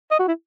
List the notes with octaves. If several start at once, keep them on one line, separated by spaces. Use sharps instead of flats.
D#5
F#4
E4